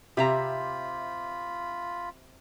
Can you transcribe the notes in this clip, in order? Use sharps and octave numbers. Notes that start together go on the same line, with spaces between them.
C3 F4 G4 E5 A#5 B5